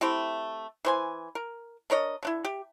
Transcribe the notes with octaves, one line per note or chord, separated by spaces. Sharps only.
A3 C4 E4 G4
E3 C5 G#5
A#4
D4 A#4 C#5 D#5
D3 D4 E4
G4